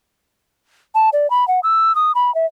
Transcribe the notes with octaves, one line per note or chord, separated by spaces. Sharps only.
A5
D5
B5
F#5
E6
D#6
B5
E5